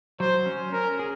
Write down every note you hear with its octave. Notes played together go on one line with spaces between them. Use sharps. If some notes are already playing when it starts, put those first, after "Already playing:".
F#3 C5
C#4
C#4 A#4
G#4